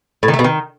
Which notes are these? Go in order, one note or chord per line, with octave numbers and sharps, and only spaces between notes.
A2
D#3
A3
B2
D#3